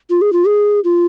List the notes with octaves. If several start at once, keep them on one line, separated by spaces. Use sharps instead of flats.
F4
G#4
F4
G#4
F4